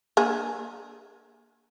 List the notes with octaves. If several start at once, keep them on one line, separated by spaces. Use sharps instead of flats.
A#3 D4 G#4